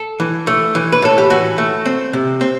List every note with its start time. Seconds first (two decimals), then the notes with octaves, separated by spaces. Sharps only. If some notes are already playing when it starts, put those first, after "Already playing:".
Already playing: A4
0.20 E3
0.47 A3
0.75 E3
0.92 B4
1.02 A2 A4
1.18 G4
1.30 E3 F#4
1.58 A3
1.86 C4
2.13 C3
2.41 C4